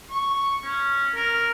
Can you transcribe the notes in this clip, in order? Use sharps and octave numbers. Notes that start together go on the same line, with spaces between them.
C#6
C#4
A#4